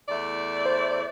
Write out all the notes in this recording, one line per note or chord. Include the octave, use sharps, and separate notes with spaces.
E2 A3 D5
C5